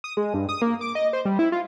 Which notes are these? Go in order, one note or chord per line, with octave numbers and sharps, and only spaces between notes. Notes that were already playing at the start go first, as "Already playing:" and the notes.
D#6
G#3
G2
D#6
A#3
D6
D#5
C5
G3
E4
F4